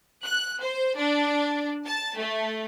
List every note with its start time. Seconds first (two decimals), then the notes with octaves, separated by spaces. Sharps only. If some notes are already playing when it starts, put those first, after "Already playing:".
0.24 F#6
0.62 C5
0.96 D4
1.86 A5
2.17 A3